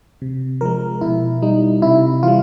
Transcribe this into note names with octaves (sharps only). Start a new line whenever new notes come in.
C3
F3 G#3 A#4
B2 E4
G3 D#4
C3 E4
E3 G3 F4